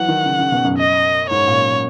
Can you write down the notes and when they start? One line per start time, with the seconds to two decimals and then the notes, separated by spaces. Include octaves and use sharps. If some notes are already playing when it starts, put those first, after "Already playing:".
Already playing: E3 F#3 F#5
0.08 D#3
0.26 C#3
0.39 C#3
0.52 B2
0.64 F#2
0.78 D#5
1.30 G#2 C#5
1.48 A#2